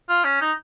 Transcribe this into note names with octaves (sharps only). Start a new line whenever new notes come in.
F4
C#4
D#4